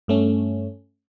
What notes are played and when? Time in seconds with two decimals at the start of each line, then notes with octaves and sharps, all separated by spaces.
0.08 G2 A3 C#4